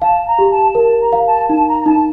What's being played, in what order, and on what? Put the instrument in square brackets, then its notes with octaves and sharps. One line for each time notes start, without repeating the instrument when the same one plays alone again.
[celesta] F5 [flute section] A5
[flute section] A#5
[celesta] G4
[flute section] A5
[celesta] A#4 [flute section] A5
[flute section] A#5
[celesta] F5
[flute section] A5
[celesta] D#4 [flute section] A5
[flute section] A#5
A#5
[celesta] D#4 [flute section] A5